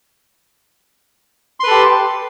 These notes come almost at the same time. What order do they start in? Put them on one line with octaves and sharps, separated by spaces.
C6 B4 A4 G4